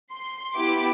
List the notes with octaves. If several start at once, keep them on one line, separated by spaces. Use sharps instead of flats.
C6
B3 E4 G4 D6